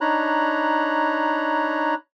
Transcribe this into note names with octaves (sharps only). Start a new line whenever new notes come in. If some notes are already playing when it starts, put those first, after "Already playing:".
D4 D#4 C#5 A#5 B5 F#6